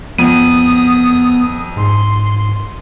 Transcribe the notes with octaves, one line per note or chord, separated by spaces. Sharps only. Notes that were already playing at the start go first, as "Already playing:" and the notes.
F2 B3 D#6 D#7
G#2 C6